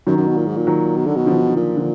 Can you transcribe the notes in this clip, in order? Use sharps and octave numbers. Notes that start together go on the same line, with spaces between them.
F#2 D#3 F#3
F#2
B2
A#2
G#2
A#2
D#3 F#3
B2
D3
B2
D3 F3
D3
D#3
A#2 D#3
D3 F3